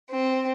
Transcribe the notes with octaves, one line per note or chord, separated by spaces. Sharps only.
C4